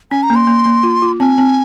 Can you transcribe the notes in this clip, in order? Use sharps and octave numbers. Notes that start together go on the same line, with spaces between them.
C#4 G#5
A#5
A#3
C6
A#3
A#3
F4
F4
C4 G#5
C4